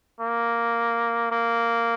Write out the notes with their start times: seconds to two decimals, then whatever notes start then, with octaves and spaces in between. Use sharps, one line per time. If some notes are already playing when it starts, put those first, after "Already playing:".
0.21 A#3
1.32 A#3